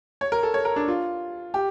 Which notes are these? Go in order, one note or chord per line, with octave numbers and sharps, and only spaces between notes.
C#5
A#4
A4
C#5
A#4
D4
F4
G4